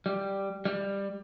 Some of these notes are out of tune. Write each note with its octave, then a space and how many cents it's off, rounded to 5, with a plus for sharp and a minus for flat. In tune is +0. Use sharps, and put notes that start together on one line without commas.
G3 +0
G3 +15